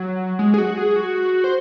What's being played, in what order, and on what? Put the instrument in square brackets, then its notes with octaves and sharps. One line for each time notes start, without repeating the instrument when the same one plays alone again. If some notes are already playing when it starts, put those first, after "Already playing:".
Already playing: [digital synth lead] F#3
G#3
G#4
F#4
G#4
F#4
C5